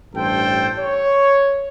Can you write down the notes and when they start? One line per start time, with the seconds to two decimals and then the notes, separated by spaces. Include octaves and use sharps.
0.14 A1 G2 A4 C5 G5
0.78 C#5